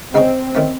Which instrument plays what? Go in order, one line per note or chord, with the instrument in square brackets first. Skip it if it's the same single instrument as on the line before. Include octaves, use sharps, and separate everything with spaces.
[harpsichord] C#3 G#3 D#4 G#4 C#5 [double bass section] C4
[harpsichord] D#3 A3 C#4